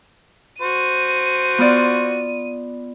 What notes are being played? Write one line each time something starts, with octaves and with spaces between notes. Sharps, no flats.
F#4 C5 D#7
B3 F4 D5